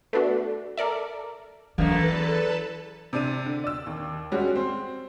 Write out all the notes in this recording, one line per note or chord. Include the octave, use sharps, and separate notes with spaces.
A3 B3 D4 F#4
A4 A#4 D5 E5
F#2 E3 F#3 A3 A#3 A4 B4 A5
E2
C3 D4 D#7
D3
D5 E6
D#2
G3 G#3 C#4 F#4
C4